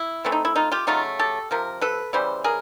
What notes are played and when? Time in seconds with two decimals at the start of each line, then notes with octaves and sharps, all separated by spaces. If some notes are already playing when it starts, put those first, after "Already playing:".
Already playing: E4
0.25 E3 A3 C4
0.32 D#4
0.45 E4
0.56 D#4 F4
0.72 F4 G4
0.87 C#3 F#3 A3 D#4 F4
1.19 G4 A4
1.51 C3 F3 A#4
1.81 A4 B4
2.13 C#3 E3 G3 C5
2.44 G#4 A#4